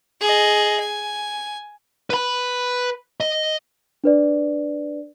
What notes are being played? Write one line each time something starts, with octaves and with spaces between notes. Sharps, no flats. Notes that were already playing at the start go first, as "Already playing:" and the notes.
G#4 D#5
G#5
B4 B5
D#5
D4 B4 D5